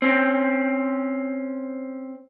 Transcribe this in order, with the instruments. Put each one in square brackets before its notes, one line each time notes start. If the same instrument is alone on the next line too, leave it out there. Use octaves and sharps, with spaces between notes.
[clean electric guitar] C4 C#4